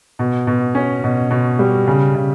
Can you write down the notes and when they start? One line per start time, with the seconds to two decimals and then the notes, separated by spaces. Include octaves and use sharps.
0.19 B2
0.47 B2
0.75 C#4
1.04 B2
1.31 B2
1.59 G3
1.88 C#3
2.15 C#3